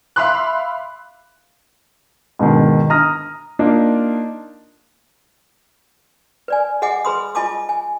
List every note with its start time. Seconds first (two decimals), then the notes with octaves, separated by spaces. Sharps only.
0.16 E5 F5 B5 C6 D6 F#6
2.39 G#2 B2 D3 D#3
2.90 A#5 D#6 F6 A#6
3.59 A#3 D4 D#4 F4
6.48 B4 D5 G#5
6.82 G#4 D#5 F#5 G#5 D6
7.05 G#4 B4 B5 C6 D#6
7.35 F4 D#5 G#5 A5 D6 D#6
7.69 G#5